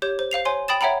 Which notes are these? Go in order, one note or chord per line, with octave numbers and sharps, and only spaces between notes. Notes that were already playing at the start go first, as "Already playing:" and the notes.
G4 C#5 G6
C5
C5 F5 C7 F7
C5 C#5 G#5 C6
G5 B5 D#6 A6 E7
C#5 E5 F#5 G5 A#5 B5